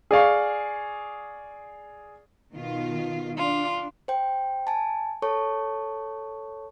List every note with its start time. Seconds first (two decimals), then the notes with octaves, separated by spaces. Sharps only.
0.11 G#4 D5 F5 C#6
2.53 B2 D#3 F4
3.38 D4 F4
4.08 C5 G5
4.67 G#5 A5
5.22 A4 C#5 A5 C#6